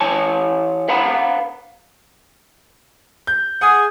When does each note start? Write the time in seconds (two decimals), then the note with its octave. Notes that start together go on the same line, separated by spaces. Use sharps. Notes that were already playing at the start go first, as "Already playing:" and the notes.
0.01 E3 C#5 G#5 A5
0.89 B4 F5 F#5 A#5 B5
3.27 G6
3.61 G#4 F#5 D#6